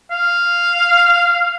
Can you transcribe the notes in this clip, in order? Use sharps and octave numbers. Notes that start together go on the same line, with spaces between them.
F5